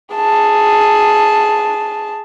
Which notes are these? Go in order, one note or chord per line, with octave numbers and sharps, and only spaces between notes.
G#4 A5